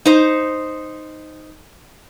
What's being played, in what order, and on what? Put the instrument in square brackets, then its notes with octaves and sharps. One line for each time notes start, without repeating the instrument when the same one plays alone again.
[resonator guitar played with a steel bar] D#4 C5